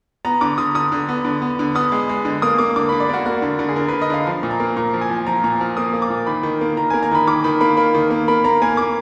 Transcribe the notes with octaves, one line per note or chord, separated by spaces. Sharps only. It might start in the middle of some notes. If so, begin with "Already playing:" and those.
B3 A#5
D3 D6
D3 D#6
D3 D#6
D3
B3
D3
B3
D3
B3 D#6
G#3
G#3
D3
A#3 D#6
A#3 D6
D3 D6
D3 B5
D5
A#3 F#4
A#3 F#4
D3
D3
G#4
D3 A#4
B4
D3
D#5
D3 F5
F3
A#2
A#5
A#3
A#2 A#5
F3
G#5
F3
F3 A#5
A#2 A#5
F3
A#3 D#6
A#3
D6
A#2
D#3 B5
D#3
A#3
D#3 A#5
A#3 G#5
A#5
D#3 B5
D#3 D6
D#3 B5
A#3 B5
A#3 B5
D#3
A#3
A#3 B5
A#3 A#5
A#3 G#5
A#3 D6